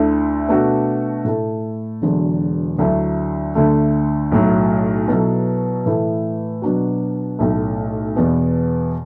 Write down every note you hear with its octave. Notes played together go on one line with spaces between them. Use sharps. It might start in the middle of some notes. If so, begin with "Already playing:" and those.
Already playing: D2 D3 A3 E4 A4
B2 A3 D4 F#4 A4
A2 A3 E4 A4
E1 E2 D3 F#3
D2 D3 F#3 A3 E4
D2 D3 A3
B1 A2 F#3
B2 F#3 B3 E4 A4
A2 E3 A3 E4 A4
B2 F#3 D4 F#4
B1 A2 A3
E2 B2 B3